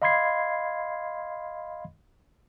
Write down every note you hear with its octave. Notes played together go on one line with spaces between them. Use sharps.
D#5 F5 B5 C6 G#6 C7